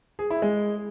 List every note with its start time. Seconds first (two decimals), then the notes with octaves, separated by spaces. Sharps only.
0.19 G#4
0.30 E4
0.42 G#3